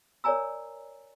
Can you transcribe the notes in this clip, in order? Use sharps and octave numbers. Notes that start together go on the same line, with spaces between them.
A#4 C#5 D5 G#5 A#5 E6